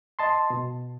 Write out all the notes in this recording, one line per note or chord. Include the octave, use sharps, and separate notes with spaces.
D#5 A5 C6
B2